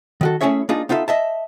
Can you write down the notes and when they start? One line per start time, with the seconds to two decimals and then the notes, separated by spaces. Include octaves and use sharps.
0.21 D#3 F#4 A4
0.41 A3 C#4 E4 G#4 C#5 E5
0.69 A#3 D4 D#4 F4 G#4
0.89 B3 D#4 F4 A4 E5
1.08 D#5 E5 A5